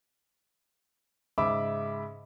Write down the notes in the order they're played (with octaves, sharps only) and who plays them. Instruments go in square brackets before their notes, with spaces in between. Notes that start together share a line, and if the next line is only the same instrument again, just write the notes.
[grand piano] G#2 C#3 E5 B5 D6 E6